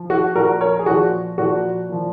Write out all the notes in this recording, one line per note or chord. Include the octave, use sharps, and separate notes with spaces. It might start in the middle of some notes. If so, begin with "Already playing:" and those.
Already playing: F3
F#4
A#2 F3 F#4 A#4
A#4 C#5
G#4
A#2 F3 F#4
A#2 F3 F#4
A#2 F3